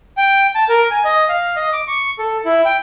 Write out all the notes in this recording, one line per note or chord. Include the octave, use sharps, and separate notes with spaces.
G5
A5
A#4
G#5
D#5
F5
D#5
D6
C#6
A4
E4
G5